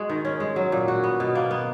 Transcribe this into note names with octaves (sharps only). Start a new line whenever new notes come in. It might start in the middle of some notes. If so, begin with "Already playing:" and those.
Already playing: G#3 F#4
D#3
C#4
G#3
F#3
A#2
F#4
B3
B2
A#3
B3